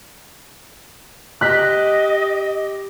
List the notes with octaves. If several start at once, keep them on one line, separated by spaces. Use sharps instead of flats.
G4 D#5 F#6 B6